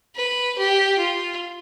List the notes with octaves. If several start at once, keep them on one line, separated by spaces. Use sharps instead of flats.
B4
G4
F4